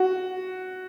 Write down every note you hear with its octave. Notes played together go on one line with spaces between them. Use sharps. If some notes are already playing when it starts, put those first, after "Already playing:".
Already playing: F#4